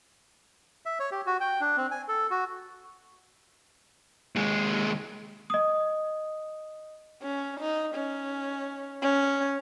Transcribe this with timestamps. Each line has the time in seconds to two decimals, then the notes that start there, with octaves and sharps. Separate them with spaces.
0.86 E5
1.00 C#5
1.12 G4
1.26 F#4
1.40 G5
1.61 D4
1.77 C4
1.91 G#5
2.08 A4
2.31 F#4
4.36 D#2 G#3
5.50 D#5 D#6
7.22 C#4
7.60 D#4
7.95 C#4
9.02 C#4